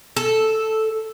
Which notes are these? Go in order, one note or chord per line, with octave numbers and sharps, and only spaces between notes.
A4